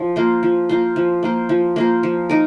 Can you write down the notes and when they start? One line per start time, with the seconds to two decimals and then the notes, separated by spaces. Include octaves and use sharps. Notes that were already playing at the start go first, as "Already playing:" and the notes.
Already playing: F3
0.16 A#3 F4 C5
0.43 F3
0.69 A#3 F4 C5
0.96 F3
1.23 A#3 F4 C5
1.49 F3
1.76 A#3 F4 C5
2.03 F3
2.30 D#4 A#4